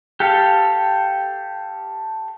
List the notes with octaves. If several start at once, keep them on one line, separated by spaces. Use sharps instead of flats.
G4 A4 F5